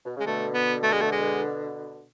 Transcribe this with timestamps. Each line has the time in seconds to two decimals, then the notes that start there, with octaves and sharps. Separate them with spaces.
0.05 B2
0.16 C#3 G#3
0.26 B2 D3 A3
0.54 B3
0.83 A3
0.92 G#3
1.01 A3
1.12 G#3